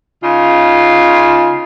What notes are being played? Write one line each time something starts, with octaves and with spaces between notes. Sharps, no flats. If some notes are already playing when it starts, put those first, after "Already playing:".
C#3 D#4 F4